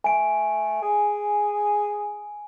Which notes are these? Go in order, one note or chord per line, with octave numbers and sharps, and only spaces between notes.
A3 G#5 D7
G#4